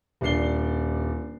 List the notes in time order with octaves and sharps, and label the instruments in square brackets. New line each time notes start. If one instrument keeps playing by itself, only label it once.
[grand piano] D#1 D4 D5 C7 G7